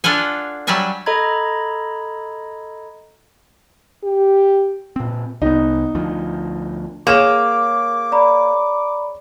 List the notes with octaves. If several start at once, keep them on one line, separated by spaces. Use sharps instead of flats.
D4 F4 A4 F#5 G#5
F#3 G3 F#4 E5 G#5 A5
A4 D#5 A#5 B5 G#6
G4
A#2 C4
C2 B3 D#4
D2 F3
A#3 G#4 C#5 D6 E7
D5 A#5 B5